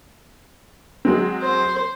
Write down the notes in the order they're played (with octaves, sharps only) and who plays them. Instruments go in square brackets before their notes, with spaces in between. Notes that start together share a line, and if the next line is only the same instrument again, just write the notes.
[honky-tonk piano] F#3 G#3 C4
[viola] C5